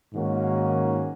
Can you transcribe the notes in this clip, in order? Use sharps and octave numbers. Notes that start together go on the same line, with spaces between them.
G#2 D#3 A#3 C#4 F#4